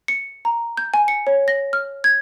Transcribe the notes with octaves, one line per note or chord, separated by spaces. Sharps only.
C#7
A#5
G6
G#5
C#7
C#5
A#6
F6
G#6